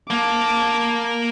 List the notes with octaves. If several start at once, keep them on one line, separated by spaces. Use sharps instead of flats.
A#3 A5 D6